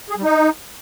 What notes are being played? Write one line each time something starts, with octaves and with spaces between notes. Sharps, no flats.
G#4
G3
D#4